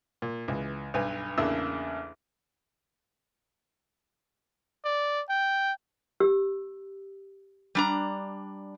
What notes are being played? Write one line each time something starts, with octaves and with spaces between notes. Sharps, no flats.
A#2
C#2 E3
B1 G2 B4 G#5
A1 E2 C#3 A#3 D4 E6
D5
G5
G4 E6
G3 D4 A#5